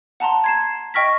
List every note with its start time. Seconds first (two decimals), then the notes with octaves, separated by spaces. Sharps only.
0.20 F#5 A5 A#5 C6
0.44 G#6 C7 E7
0.94 D#5 G5 C#6 F6 A#6 B6